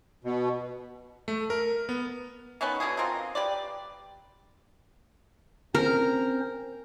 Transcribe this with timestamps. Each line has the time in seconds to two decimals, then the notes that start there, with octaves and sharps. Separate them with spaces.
0.24 B2
1.28 A3
1.50 A#4
1.89 B3
2.61 D#3 B3 C#4 B4
2.80 B2 D3 B3 G#4
2.97 C4 F4 A#4 D#5
3.35 G4 B4 D5
5.75 C4 C#4 A#4 C5